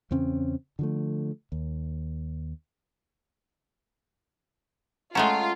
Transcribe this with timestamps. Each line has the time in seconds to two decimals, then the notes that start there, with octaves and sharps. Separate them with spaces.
0.11 E2 C#3 C4 C#4
0.79 D3 F3 A3
1.52 D#2
5.15 G#3 A3 C#4 F4 F#5 A5 A#5